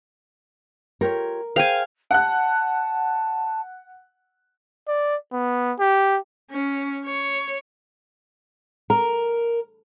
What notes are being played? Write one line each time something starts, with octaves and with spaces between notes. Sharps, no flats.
F4 G4 A#4 C#5
G#4 C5 F5 G5 G#5
F#5 A5 F#6
D5
B3
G4
C#4
C#5
A#4